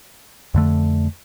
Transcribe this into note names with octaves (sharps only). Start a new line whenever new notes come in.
F2 D3 A3